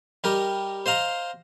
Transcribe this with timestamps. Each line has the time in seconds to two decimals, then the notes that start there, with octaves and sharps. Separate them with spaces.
0.24 G3 G4 A#4 D#5
0.86 C5 D#5 F5 A#5